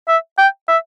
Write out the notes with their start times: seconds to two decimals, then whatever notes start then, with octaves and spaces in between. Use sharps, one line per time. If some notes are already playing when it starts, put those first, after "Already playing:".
0.08 E5
0.38 G5
0.68 E5